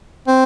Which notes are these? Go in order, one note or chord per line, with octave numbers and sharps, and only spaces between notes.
C4